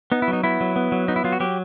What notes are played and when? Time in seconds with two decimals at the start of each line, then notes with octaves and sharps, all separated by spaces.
0.12 B3 D#4
0.22 E4
0.28 F#3
0.33 D#4
0.43 B3 E4
0.61 F#3
0.76 B3
0.92 F#3
1.08 B3 D#4
1.16 E4
1.24 F#3 F4
1.32 F#4
1.40 F#3 G4